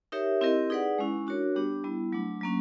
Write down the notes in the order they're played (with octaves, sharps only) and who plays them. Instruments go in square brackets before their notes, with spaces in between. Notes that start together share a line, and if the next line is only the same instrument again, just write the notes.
[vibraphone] D#4 G4 A#4 C#5 E5
C4 E4 G4 A#4 D#5
D#4 G#4 B4 D5 F#5
G#3 C#4 E4
D4 F#4 A#4 C#5
G3 B3 D4 G4
G3 B3 E4
F#3 A3 D4
F#3 A#3 C#4